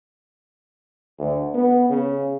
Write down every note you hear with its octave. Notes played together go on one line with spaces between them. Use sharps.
D2
B3
C#3